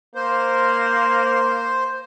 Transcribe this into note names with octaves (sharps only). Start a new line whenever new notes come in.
A#3 C5